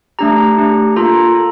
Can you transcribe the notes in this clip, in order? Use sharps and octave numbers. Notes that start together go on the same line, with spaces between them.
A3 D4 G4 A#5
A3 D4 G4
A#3 F4 A4 A#5
A4